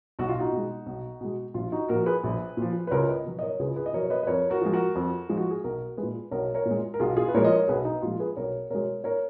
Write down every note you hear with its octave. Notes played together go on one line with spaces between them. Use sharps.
B1 F#4
F4
D#4 F#4
B2 G#3
B1
B2 G#3
A#1 F4
D#4 F#4
A#2 F3 F#4 A#4
G#4 B4
A#1
A#2 F3
B4
C#2 A#4 C#5
B4 D#5
B2 F#3
D#5
A#4 C#5
C#2 G#4 B4
G#4 B4
D#5
B2 F#3 A#4 C#5
C#5
B4 D#5
B4
F2 A#4 C#5
F#4 A#4
F3 G#3
F#4 A#4
F2
F3 G#3
F#4
G#4
B1 F#4 A#4
G#3 G#4 B4
A#2
B1 A#4 C#5
A#4 C#5
A#2
G#3
A#4
B1 F4 G#4
F4 G#4
B4
A#2 F3 G#3 A#4 C#5
D#5
A#4 C#5
B1 G#4 B4
D#4
A#2 F3 G#3 F4
G#4 B4
B1 A#4 C#5
B2 G#3 A#4 C#5
A#4 C#5